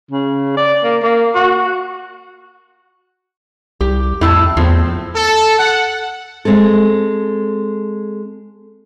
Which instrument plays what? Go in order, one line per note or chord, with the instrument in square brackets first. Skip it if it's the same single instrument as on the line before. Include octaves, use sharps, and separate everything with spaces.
[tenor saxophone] C#3
D5
A#3
A#3
F#4
[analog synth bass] C2 [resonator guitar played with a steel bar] G4
[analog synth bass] F2 [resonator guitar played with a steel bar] A2 E4 A5
[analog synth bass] E2 [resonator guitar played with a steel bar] A2 F3 C4
[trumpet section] A4
F#5
[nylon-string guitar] G#3 C4 G#4 A4